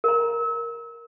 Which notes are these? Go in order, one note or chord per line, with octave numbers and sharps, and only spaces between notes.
A#4 A#5